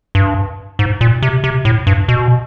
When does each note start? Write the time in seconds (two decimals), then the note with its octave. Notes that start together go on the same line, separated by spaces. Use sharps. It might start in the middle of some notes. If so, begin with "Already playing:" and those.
0.15 G2
0.79 G#2
1.01 A#2
1.22 C3
1.44 C3
1.65 A2
1.87 G2
2.08 B2